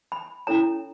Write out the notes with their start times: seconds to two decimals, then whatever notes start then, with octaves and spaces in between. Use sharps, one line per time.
0.12 B5
0.47 C#4 E4 A4 C#5 A#5